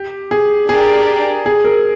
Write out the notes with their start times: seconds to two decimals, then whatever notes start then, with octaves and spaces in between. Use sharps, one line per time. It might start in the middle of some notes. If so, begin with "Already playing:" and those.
Already playing: G4
0.31 G#4
0.69 D4 G4 G#4 A#4 D5
1.46 G#4
1.65 A#4